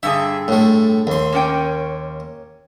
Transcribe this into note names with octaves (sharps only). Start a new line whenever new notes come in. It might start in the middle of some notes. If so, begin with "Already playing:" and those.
G2 D3 G#4 E5
A2 A3
D#2 C6
A#3 C#4 G5